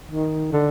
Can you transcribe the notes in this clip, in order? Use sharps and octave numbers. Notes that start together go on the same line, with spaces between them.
D#3
D3